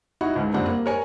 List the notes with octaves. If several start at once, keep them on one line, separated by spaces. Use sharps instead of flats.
D#4 E4 F#4 F#5
C#2 G#2
F#1 F2 G3 C4 D4 F#5
A#3
A#4 C#5 G#5